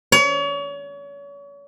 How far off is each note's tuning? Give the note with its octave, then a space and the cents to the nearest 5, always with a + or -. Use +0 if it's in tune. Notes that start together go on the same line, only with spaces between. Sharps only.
C#5 +35